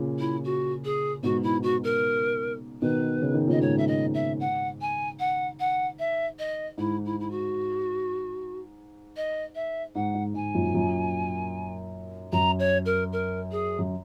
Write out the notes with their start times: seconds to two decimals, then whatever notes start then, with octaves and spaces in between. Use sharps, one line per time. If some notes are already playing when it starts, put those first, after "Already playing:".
Already playing: A#2 C#3
0.18 E4
0.44 F#4
0.84 G#4
1.23 G#2 B2 F#4
1.43 E4
1.63 F#4
1.84 A#4
2.81 B2 D#3 B4
3.22 C#3
3.34 D#3
3.47 A#2 C#3 D#5
3.61 G#2 C#5
3.78 E5
3.87 D#5
4.14 E5
4.40 F#5
4.81 G#5
5.19 F#5
5.59 F#5
5.99 E5
6.39 D#5
6.78 G#2 E4
7.05 E4
7.20 E4
7.30 F#4
9.16 D#5
9.55 E5
9.95 G#2 F#5
10.14 G#2
10.34 G#2 G#5
10.54 F#2 A#2
10.74 F#2 A#2
12.32 F#2 A#5
12.59 C#5
12.85 A#4
13.12 A#4
13.51 G#4
13.79 F#2